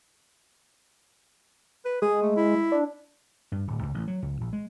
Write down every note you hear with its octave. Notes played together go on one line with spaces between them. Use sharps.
B4
G#3 G#4
A3
E4
D4
G2
D1
C#2
A1
F#3
C#2
A#1
G#3